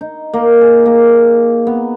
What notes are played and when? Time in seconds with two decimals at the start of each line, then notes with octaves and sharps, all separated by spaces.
0.01 D#4
0.34 A#3
0.61 G#4
0.86 A#3
1.67 B3